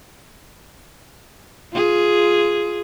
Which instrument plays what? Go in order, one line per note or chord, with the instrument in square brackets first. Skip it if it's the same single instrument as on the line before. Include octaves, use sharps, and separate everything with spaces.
[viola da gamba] F4 G#4